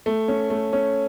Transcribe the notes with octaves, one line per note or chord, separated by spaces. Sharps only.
A3
C#4
A3
C#4